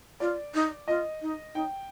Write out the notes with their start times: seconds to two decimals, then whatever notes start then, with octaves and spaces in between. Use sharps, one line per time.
0.20 F4 D5
0.54 D#4
0.88 F4 D#5
1.22 D#4
1.55 D#4 G5